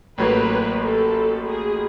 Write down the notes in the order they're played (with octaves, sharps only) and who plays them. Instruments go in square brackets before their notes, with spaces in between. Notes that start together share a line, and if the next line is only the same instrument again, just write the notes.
[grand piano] A1 A2 F#3 A#3 [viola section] B4
[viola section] A4
G#4